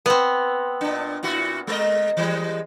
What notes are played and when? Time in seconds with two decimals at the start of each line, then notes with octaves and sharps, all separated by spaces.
0.06 B3 C4
0.81 A#2 D4
1.23 A#2 E4 F#4
1.67 G#3 A#4 D#5
2.17 E3 G3 G#3